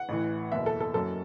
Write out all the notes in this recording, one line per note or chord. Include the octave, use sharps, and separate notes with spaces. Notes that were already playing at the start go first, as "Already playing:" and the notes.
Already playing: F#5
A1 A2 E3
F#1 E2 B2 E5
A4
A4
F#1 F#2 F#3 A4